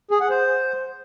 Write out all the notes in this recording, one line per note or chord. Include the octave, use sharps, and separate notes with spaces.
G#4
F#5
C5